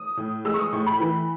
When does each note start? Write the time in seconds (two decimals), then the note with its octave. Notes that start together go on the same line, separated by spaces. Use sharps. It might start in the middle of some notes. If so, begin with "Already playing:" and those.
Already playing: D#6
0.17 A2
0.45 G#3 E6
0.54 C#6
0.59 D#6
0.72 A2 C#6
0.86 B5
1.00 E3